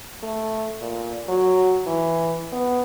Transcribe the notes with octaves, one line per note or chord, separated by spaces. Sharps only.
A3
A#2
F#3
E3
B3